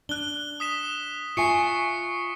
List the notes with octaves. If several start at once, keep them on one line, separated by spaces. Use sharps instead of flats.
D4 F#6 G7
D#6 B6 E7
F4 E5 G#5 C#6 C7 C#7